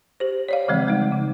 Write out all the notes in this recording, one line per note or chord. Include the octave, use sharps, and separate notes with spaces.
G4 C5
C#5 D5 F5
C#3 E3 F3 G#3 C4
G3 G#3 D#4
C#3